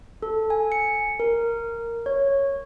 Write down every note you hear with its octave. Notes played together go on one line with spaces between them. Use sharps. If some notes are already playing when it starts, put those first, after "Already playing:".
A4
G#5
C#7
A#4
C#5